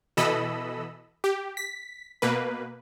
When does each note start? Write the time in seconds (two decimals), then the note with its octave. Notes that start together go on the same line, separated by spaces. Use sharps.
0.17 B2 E3 A4 D#5 B5 E6
1.24 G4
1.57 B6
2.22 B2 A#3 B4